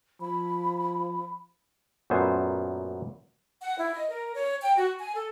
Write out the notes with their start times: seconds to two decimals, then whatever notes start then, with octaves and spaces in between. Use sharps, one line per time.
0.21 F3 B5
2.10 F#2 A#2 A3 B3 C5 G#5
3.62 F#5
3.78 E4
3.95 D#5
4.10 A#4
4.35 C#5
4.61 G5
4.76 F#4
4.99 G#5
5.15 A4